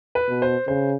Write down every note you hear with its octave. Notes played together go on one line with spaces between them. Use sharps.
B4
B2
C5
C#3 C5